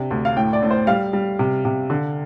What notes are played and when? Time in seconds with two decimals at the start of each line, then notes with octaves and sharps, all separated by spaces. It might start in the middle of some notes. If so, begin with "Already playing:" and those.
Already playing: C3 D4
0.11 D2
0.25 F5
0.37 A2 G5
0.53 D5
0.62 A2
0.71 C5
0.87 G3 F5
1.13 G3
1.39 C3
1.65 C3
1.90 D3